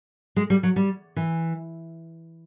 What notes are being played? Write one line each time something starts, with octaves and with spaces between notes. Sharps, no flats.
G#3
G3
F#3
G3
E3